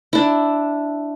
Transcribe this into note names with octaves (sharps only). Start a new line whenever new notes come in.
D4 E4